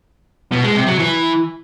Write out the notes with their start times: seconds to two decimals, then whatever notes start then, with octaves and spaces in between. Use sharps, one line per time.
0.52 B2
0.64 G#3
0.75 C3
0.87 F#3
0.99 E3